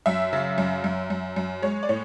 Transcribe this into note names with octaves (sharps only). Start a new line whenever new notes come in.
F#2 E5
C#3
F#2
F#2
F#2
F#2
G#3 C#5
D5
A2 C#5